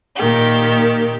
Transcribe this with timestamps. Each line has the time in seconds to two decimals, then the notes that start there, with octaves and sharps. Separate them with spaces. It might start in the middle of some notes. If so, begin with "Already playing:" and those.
0.17 A#2 D#3 G4